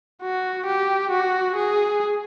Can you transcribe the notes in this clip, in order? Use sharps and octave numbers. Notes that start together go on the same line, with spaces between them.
F#4
G4
F#4
G#4